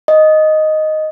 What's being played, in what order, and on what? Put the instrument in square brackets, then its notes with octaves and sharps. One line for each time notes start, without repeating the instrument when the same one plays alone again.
[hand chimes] D#5